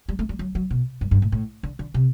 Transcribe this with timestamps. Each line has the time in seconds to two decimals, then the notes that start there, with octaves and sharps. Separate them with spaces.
0.08 G3
0.19 A3
0.29 G3
0.39 F#3
0.55 F#3
0.70 B2
1.01 G2
1.11 G2
1.22 A2
1.32 A2
1.63 D3
1.79 D3
1.94 C3